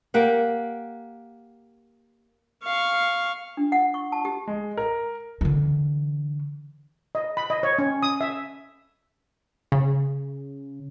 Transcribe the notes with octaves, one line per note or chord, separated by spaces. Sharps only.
A#3 G4 F#5
F5 C#6
D4
F#5
C#6
A5
G4
G#3
A#4
D3 E3
D#5
B5
D#5
C#5
C#4
D#6
E5
C#3